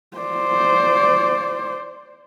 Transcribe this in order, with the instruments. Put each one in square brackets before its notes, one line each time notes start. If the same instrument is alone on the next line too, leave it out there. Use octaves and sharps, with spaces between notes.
[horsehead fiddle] C5 D5